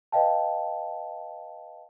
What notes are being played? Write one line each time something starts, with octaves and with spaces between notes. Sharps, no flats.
B4 D#5 F5 G5 A5